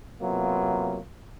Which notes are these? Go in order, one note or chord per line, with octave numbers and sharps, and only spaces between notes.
C3 F#3 A#3 B3 F4